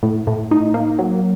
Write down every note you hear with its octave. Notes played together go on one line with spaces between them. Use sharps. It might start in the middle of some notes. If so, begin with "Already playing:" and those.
A2
A2
D#4
A#3
F#3